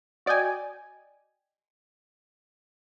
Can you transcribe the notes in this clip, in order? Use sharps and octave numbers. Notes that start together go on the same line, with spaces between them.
F#4 D5 D#5 G5 G#5